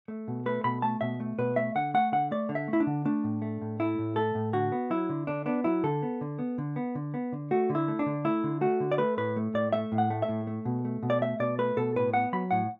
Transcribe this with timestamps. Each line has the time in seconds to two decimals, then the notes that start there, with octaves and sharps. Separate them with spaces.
0.08 A3
0.28 B2
0.46 A3 B4
0.64 B2 B5
0.82 A3 A5
1.01 B2 E5
1.20 A3
1.38 B2 B4
1.56 A3 E5
1.75 D3 F#5
1.94 A3 F#5
2.12 D3 F#5
2.31 A3 D5
2.49 D3
2.55 E5
2.68 A3
2.73 E4
2.80 D4
2.87 D3
3.05 A3 D4
3.24 A2
3.42 A3
3.62 A2
3.80 A3 E4
3.99 A2
4.16 A3 A4
4.35 A2
4.53 D3 F#4
4.72 B3
4.90 F#3 E4
5.09 D3
5.27 D3 D4
5.46 B3 D4
5.64 F#3 E4
5.84 D3 A4
6.03 B3
6.21 D3
6.39 B3
6.58 D3
6.76 B3
6.95 D3
7.14 B3
7.32 D3
7.51 A3 F#4
7.70 D3
7.75 E4
7.88 A3
7.99 D4
8.06 D3
8.25 A3 E4
8.44 D3
8.61 A3 F#4
8.80 D3
8.92 D5
8.98 A3 B4
9.17 A2 B4
9.36 A3
9.54 A2 D5
9.73 A3 E5
9.92 A2
9.98 F#5
10.10 A3
10.22 E5
10.29 A2
10.47 A3
10.65 B2
10.85 A3
11.03 B2
11.10 D5
11.21 A3 E5
11.40 B2 D5
11.59 A3 B4
11.77 B2 A4
11.96 A2 B4
12.13 B3 F#5
12.33 F#3 B5
12.51 A2 F#5